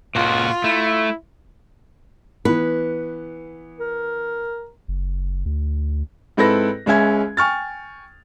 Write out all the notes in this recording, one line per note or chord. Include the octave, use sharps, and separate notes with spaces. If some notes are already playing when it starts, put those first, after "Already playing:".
C#2 A#2 F4 F#4
A3 E4
E3 B3 B4
A#4
F#1
D2
G#2 C4 E4 A4 B4 A#6
C#2 G#3 C#4 E5 G#5 G#6
G5 G#5 C#6 F6 A6